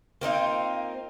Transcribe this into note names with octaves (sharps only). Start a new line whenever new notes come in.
A#3 C4 D#4 F4